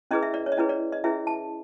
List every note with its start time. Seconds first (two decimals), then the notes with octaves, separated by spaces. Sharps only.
0.11 C#4 E4 G#4 B4 D#5
0.23 E5
0.34 D5
0.46 C#5
0.52 D#5
0.57 C#4 E4 G#4 B4 D5
0.69 D5
0.92 D#5
1.04 C#4 E4 G#4 B4 E5
1.27 A5